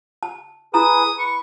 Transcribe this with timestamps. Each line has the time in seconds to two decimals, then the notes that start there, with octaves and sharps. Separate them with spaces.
0.23 A5
0.74 E4 G#4 B4 A#5 D#6
1.19 B4 C#6